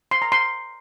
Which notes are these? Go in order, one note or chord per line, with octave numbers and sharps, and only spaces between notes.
C6
A#5
C6